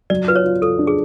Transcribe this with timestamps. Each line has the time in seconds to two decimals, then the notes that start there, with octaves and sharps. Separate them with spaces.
0.10 F#3 D5
0.28 F4 B4
0.36 C#5
0.44 F4
0.61 F4 A4
0.79 D4
0.87 G#4